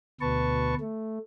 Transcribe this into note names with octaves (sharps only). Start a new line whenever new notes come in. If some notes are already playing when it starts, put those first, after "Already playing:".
D2 B2 B4 A5 C#6
A3